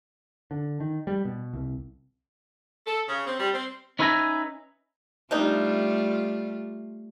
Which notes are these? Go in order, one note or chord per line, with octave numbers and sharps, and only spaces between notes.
D3
D#3
G3
B2
C2
A4
C#3
C4
G3
C4
C#4 D#4 B4 E5 G#5 A#5
C3 G3 A3 D4 D#4 F4